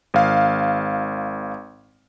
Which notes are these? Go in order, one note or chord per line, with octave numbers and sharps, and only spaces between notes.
G#1 F5